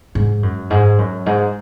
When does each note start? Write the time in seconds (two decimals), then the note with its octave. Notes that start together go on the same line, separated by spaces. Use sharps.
0.15 G#2
0.43 F#2
0.70 G#2
0.98 F#2
1.26 G#2